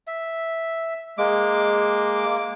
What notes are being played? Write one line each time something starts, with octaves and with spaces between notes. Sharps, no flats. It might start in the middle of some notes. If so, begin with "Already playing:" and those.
E5
G#3 A#3 D6